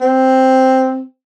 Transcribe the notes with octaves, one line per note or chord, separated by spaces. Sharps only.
C4